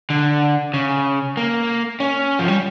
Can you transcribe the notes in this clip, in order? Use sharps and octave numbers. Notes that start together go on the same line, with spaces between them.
D3
C#3
A#3
C#4
F3
G3